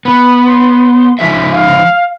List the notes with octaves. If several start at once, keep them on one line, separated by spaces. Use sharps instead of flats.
B3 B5
C6
F3 G#3 E5 B6
F5